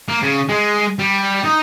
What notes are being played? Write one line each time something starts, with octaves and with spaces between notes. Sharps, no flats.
A#3
C#3
G#3
G3
D#4